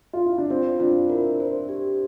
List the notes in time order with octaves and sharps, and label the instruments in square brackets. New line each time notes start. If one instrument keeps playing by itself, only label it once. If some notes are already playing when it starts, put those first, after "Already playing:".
[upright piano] F4
E4
D4
[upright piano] C4 [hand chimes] F4
[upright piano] D4 [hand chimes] F4
[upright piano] E4 [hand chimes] A#4
[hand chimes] C5
G4